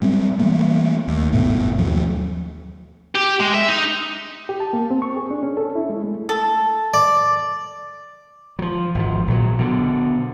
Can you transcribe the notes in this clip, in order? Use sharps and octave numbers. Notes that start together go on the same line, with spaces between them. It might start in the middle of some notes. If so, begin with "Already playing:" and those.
F#3 G3 C4
E3 G3 A3 A#3
D#2
G#1 G2 B2 A3
D#2 F3 F#3
G4
G#3
E5
D#4
G4
A5
A#3
C4
C#6
G#4
D4
C#4
A4
E4
G#3
A3
A4
D5
F3 F#3
G#1 F3
A#1 F#3
B2 D3